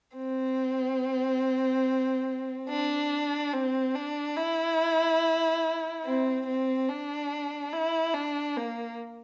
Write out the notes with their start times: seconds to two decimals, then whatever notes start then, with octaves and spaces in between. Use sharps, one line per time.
0.17 C4
2.69 D4
3.53 C4
3.95 D4
4.37 E4
6.05 C4
6.47 C4
6.89 D4
7.73 E4
8.14 D4
8.57 A#3